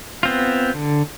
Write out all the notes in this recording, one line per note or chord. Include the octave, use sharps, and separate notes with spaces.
B3 C4 F4
D3